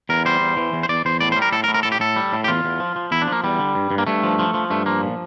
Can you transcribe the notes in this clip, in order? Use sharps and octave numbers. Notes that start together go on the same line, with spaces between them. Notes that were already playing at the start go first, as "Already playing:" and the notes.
E2 A#4
G3 C5
E2
E3
E2
C5
E2 D5
E2 C5
A2 D5
G3 C5
A#4
A2 A4
A#4
A2
A#4
A2 A4
G4
A2 A4
G3
A2
G4
E2 F4
E2
F3
F3
E2 E4
D4
F3 A#3
E2 G3
D3
G2
G2
A#3
G2 A3
F3
F3
F3
G2 A3
F3 A#3
A#2